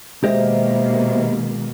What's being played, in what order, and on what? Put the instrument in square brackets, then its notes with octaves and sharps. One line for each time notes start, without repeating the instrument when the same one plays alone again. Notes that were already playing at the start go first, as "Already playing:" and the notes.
[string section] B2 D#3 A#3 [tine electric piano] G#3 [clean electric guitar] G4 D#5 [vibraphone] C5 E5